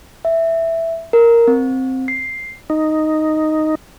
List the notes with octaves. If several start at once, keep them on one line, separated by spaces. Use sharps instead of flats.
E5
A#4
C4
C7
D#4